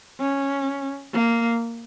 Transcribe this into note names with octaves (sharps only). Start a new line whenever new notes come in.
C#4
A#3